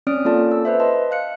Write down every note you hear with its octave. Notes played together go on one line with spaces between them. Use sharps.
C4 C#4 D5 D#6 F6 D7
A#3 C#4 F4 A4 D5 A5
E6
B4 C5 E5
D#5 A5 C6
F5 F#6 C#7